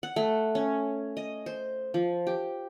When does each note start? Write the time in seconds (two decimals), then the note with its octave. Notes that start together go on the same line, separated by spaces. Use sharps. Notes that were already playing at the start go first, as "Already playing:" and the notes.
0.03 F#5
0.16 A3
0.55 C#4
1.17 D#5
1.46 C5
1.94 F3
2.27 G4